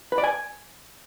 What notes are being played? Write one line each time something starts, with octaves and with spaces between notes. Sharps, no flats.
B4
D5
G#5